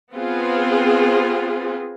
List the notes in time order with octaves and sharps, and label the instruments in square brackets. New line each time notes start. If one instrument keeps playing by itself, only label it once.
[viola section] B3 C4 F4 G#4